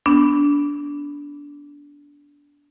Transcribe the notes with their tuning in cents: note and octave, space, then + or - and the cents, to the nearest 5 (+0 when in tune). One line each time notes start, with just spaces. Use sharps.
B3 +0 D4 -20